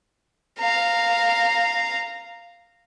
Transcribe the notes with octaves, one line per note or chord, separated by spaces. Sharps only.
F5 A#5